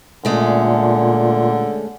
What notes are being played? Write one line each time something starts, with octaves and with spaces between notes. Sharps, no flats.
A#2 D3 G#3 A3 C#4